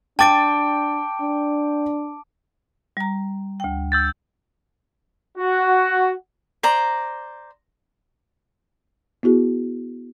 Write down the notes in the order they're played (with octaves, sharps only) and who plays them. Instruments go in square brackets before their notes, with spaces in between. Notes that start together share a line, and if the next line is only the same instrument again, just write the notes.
[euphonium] D4 [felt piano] G5 A6 [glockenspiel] A5 D6 D7
[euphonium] D4
[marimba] G3 A#5
D2 G5
[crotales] E6 G6 A6
[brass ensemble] F#4
[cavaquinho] C5 D5 A#5
[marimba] B3 E4 F#4 G#4